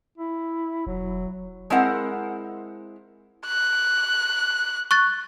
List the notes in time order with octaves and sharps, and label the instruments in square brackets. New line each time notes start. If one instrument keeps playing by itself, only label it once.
[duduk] E4
[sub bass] E1 [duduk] F#3
[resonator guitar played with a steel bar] G#3 C4 E4 A#4 F#5
[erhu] F#6
[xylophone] C#6 F#6 A6